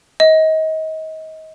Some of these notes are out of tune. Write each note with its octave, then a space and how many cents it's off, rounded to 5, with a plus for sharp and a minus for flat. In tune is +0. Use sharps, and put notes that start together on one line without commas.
D#5 +30